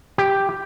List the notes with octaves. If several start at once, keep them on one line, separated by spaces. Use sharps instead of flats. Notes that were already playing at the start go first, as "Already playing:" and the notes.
G4